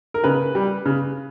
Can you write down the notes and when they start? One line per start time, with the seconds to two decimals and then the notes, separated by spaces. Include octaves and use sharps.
0.14 A#4
0.24 C#3 B4
0.55 G3
0.86 C#3